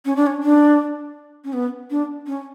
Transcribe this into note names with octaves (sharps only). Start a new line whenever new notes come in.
C#4
D4
C#4
D4
C#4
B3
D4
C#4